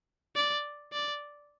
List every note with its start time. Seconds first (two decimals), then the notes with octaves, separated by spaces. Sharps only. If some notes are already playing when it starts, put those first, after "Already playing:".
0.36 D5
0.93 D5